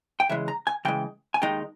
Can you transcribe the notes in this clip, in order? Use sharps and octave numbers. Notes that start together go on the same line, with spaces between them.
G5
C#3 E3 G#3 E5
A#5
G#5
C#3 E3 G#3 G5
G#5
D#2 D#3 G#3 D#4 G5